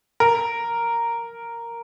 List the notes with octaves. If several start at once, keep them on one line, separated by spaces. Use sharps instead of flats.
A#4